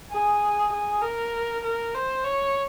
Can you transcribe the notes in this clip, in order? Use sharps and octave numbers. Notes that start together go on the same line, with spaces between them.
G#4
G#4
A#4
A#4
C5
C#5